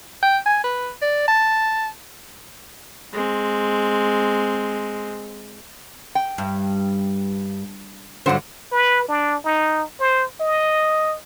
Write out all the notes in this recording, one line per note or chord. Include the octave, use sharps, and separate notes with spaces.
G5
G#5
B4
D5
A5
G#3 C4
G5
G2
G2 D3 F#3 C5 F#5
B4
D4
D#4
C5
D#5